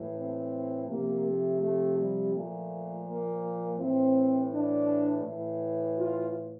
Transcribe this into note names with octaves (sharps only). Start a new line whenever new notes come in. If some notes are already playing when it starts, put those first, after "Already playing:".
Already playing: A2 E3
C4
C3 F3 A#3
A3
A3
G3
A#2 F3 A3
A#3
A2 E3 C4
D4
A2 E3
F4